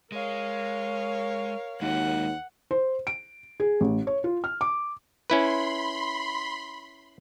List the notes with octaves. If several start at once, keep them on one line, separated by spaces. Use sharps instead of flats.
G#3 A#4 C#5 F5
D#2 G#3 F#4 G4 F#5
C5
D7
G#4
A1
C#5
F4
F6
D6
C#4 E4 B4 B5 C6